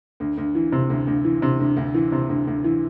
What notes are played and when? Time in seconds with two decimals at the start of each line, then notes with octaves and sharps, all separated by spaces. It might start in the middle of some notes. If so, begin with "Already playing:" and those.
0.20 D2
0.37 D2
0.55 E3
0.72 C3
0.90 D2
1.07 D2
1.25 E3
1.42 C3
1.60 D2
1.77 D2
1.94 E3
2.12 C3
2.29 D2
2.47 D2
2.64 E3